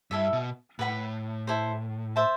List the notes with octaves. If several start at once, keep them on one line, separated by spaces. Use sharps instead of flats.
G2 E4 A4 E5
B2
A2 B4 F#5 B5
E4 A4 C5
C5 E5 A5